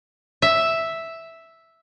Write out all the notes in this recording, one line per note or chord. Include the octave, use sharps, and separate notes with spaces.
E5